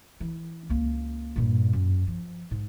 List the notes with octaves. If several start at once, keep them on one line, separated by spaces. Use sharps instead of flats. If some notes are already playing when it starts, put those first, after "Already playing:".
E3
C#2 A#3
G2 A#2
F#2
F3
G#2